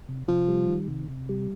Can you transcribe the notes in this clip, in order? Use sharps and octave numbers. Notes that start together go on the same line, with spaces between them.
C3
C3 F3
G3
D#3
C3
C3
G3